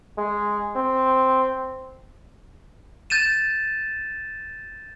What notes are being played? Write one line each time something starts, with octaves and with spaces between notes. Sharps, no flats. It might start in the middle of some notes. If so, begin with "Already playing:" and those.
G#3
C4
G6 A6 D#7 E7